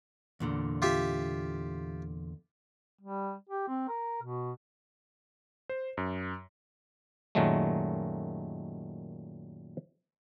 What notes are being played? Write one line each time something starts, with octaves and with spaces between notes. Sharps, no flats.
E2 A#2 D3
F4 G4 E5
G3
G4
C4
A#4
B2
C5
F#2
F#2 A#2 D#3 F#3 G#3 A3